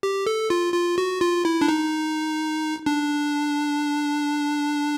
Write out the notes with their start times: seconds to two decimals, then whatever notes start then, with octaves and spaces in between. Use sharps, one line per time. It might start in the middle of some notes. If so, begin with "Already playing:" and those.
0.03 G4
0.26 A4
0.50 F4
0.74 F4
0.98 F#4
1.21 F4
1.45 E4
1.61 D4
1.68 D#4
2.86 D4